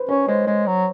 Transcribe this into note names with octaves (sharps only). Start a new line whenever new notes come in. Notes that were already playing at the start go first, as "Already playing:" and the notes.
Already playing: B4 C5
C#4 C#5
G#3 C5
G#3 C5
F#3